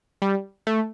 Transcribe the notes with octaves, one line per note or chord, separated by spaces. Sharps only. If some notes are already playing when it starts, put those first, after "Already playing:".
G3
A3